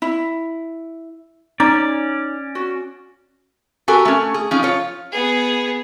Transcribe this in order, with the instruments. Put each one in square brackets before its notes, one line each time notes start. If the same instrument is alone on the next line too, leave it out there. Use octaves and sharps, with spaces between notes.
[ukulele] E4
[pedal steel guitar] C#4 D5 [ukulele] D#4
[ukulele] F#4
[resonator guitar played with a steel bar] F#4 G4 A4 A#4 G#5
A3 C#4
G#4
F3 C#4 D#4
F4 C#5
[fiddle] B3 G#4